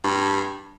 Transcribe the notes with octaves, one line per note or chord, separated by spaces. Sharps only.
G2